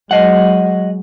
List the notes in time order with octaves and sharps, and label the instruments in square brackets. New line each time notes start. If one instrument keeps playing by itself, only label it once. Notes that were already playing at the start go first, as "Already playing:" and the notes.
[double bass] F#3 G#3 [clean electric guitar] D#5 F#5